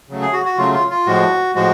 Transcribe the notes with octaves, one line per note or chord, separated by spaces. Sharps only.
C#3 F#3 A3
G#4
F#4
F#4
C#3 F#3 A3 F4
F4
F4
A2 F3 G#3 F#4
A2 F3 G#3 F#4